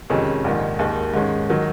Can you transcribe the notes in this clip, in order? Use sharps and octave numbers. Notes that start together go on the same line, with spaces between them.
F2 C3 D#3 G#3 C#4
A#1 G#2 D#3
D#2 D#3 G#3
G#2 D#3 G#3 C#4
D#3 F#3